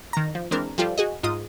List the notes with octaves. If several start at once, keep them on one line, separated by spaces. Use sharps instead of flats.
D#3 A#5
F3
E3 G#3 C4 D4 A#4
F3 G3 F4 G4 A4
F#4 G#4 D#5
G#2 F4 D#5 D#6